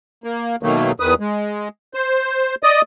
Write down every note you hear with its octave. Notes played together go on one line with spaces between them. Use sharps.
A#3
B2 D#3 F#3 A3 A#3
E2 D#3 B4 D#6
G#3
C5
D5 D#5 D#6